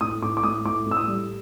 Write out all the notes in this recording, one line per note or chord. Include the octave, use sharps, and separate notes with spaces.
A2 D#6
A2 D6
D6
A2 D#6
A2 D6
A2
E6
D#6
G3